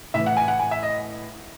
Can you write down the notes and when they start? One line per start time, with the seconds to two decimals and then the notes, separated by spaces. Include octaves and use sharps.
0.14 A2 E3 E5
0.26 F#5
0.37 G#5
0.48 F#5
0.59 G#5
0.71 E5
0.83 D#5